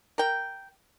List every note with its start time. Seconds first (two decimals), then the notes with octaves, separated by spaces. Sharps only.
0.18 A#4 G5